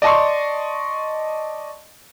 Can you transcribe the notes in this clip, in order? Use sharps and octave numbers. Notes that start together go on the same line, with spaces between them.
D5 D#5 A5 C6 C#6